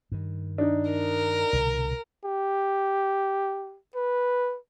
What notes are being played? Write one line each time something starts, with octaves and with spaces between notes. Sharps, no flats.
G2 D#3
D4 D#4
A#4
C2 B2 D3
G4
B4